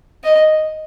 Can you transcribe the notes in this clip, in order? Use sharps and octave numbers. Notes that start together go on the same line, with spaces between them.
D#5